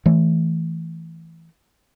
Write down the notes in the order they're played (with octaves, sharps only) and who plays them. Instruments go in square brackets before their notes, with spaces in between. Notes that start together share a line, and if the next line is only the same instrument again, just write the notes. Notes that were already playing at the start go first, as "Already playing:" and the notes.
[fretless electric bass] E3 A3